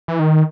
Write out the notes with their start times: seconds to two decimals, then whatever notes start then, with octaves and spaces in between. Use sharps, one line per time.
0.08 E3
0.19 D#3